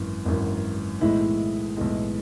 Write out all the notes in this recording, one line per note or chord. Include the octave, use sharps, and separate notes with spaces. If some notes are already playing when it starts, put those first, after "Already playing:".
Already playing: G#1 F#2 E3
G#1 F#2 E3
B1 A2 E3 G#3 E4
B1 A2 E3 G#3